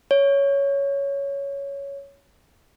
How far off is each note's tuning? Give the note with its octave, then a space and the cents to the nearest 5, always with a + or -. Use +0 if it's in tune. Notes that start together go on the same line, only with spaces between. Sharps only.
C#5 +10